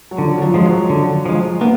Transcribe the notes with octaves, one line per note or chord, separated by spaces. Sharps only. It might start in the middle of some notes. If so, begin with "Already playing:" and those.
F#3
D3 F3
F#3
F3
F3 G#3
F#3
D3
F3 G#3
A#3 B3